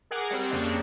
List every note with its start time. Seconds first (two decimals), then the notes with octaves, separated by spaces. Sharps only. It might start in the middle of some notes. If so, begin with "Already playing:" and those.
0.11 G#4 A#4 F#5 D6
0.31 G3 C4
0.51 F2 C#3 A#3 D4